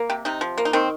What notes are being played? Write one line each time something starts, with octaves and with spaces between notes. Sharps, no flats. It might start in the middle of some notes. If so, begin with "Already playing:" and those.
Already playing: A#3
C3 G4
C3 D#4
F3
A#3
D#4
D#3 C4